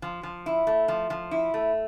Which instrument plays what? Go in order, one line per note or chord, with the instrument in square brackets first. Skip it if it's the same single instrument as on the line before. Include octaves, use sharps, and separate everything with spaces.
[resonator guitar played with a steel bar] F3
F3
E4
A3
F3
F3
E4
A3